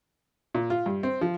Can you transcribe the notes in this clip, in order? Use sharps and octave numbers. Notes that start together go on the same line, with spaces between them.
A#2
F4
G2
C4
F3